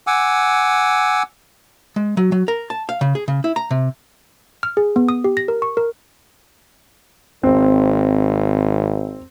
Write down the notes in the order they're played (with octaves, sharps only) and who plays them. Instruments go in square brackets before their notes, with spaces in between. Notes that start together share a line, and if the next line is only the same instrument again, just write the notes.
[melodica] F#5 G#5 D6 E6
[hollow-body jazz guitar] G#3
F#3
F#3
A#4
A5
F5
C#3
G#4
C#3
E4
A#5
C3
[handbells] F6
G#4
B3
D#6
G4
A#6
A#4
C#6
A#4
[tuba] G#1 [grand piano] C4